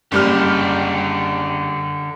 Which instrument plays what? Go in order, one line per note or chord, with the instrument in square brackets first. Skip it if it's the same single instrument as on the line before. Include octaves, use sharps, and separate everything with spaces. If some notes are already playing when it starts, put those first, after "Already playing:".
[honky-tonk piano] F#1 G3 F6 [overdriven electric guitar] D3 G4